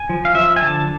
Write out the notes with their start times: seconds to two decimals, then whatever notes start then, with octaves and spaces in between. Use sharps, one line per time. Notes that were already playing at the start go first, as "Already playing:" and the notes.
Already playing: G#5
0.09 F3
0.25 F5
0.35 F3 E5
0.56 G#5
0.61 D3 A5